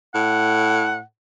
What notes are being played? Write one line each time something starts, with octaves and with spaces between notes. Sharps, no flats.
A2 F#5